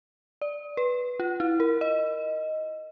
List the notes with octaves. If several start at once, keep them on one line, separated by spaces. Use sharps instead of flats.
D5
B4
F4
E4
A#4
D#5